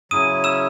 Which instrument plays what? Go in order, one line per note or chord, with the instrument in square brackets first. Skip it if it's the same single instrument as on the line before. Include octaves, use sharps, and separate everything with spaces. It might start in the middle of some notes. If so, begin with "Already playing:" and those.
[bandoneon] C#3 F#3 C#4 E4 [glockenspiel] D#6 D#7
[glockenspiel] E6 E7